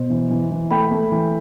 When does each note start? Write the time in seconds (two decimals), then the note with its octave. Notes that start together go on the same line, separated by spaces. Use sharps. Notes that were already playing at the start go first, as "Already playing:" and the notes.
Already playing: B2 C5
0.10 E3
0.30 E3
0.51 E3
0.71 A3 G5 B5
0.91 A3
1.12 E3